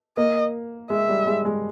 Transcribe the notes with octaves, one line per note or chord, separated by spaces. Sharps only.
A#3 D#5
G#3 E5
G3
G#3
G#3